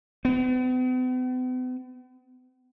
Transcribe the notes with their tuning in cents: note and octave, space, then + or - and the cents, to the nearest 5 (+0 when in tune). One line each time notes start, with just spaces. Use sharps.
B3 +45